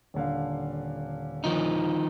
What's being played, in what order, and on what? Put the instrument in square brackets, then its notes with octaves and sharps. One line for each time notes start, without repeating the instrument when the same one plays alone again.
[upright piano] D#1 D3 F5
[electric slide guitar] D#3 F3 D#4